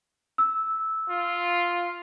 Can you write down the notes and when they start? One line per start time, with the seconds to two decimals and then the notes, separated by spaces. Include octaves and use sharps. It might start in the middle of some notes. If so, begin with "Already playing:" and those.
0.38 E6
1.10 F4